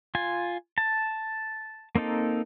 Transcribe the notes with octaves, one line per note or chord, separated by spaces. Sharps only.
F4 G#5
A5
A#3 C4 D#4 A4